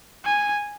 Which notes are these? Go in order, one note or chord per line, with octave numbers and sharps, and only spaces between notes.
G#5